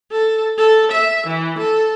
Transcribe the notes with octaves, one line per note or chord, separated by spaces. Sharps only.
A4
A4
E5
E3
A4